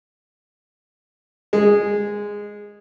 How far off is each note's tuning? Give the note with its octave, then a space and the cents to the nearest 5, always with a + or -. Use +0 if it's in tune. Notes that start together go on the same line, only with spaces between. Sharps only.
G#3 -10